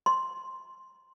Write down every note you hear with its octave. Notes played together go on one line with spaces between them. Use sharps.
C6